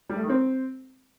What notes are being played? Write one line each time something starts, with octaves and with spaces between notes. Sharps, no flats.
G3
A3
D#3
C4